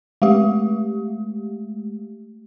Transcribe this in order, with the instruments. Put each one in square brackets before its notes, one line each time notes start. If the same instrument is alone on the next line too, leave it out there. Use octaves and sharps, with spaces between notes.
[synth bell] G#3 A3 G4